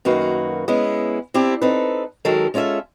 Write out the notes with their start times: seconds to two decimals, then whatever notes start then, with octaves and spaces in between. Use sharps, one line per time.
0.05 F#2 D#3 A#3 F#4 B4
0.68 G#3 B3 C#4 E4
1.34 C4 D4 E4 G4
1.62 C4 D#4 A4 B4
2.25 D#3 F#3 G#3 A4 A#4
2.54 G#3 C#4 F4 A4 E5